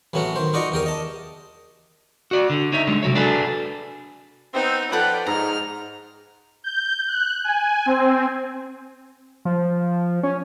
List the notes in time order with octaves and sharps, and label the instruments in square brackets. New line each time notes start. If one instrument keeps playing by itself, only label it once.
[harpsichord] A1 A2 F#3 B3 C#4 F#4
D#3 C5
D#4 F4 F#4 D5 D#5 C#6
E2 G4 A#4 D#6
D#5 A5
[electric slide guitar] F#4 D5
D3
D#4 C#5 E5
D3 G#3
C3 E3 F#3 C#5
D4 F#4 G#4 A4 B4
[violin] B3 D#4 [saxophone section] C4
[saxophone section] F3 B4 [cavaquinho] A4 F#5 [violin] D5 G5
[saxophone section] G#2 [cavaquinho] A#5 [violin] F6
[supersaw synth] G6
F#6
G#5
C4
[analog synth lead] F3
C#4